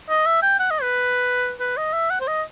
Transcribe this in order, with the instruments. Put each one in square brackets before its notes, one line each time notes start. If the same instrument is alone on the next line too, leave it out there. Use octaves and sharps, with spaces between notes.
[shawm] D#5
E5
G5
F#5
D#5
B4
B4
D#5
E5
F#5
C5
D#5